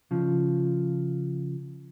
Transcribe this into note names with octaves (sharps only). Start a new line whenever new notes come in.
C#3 F3